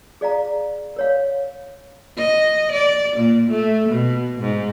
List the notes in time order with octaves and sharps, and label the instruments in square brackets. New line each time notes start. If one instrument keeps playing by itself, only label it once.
[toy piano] G#4 D5 F5 A#5
A#4 C#5 F5
[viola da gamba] D#5
D5
A#2
A3
B2
G#2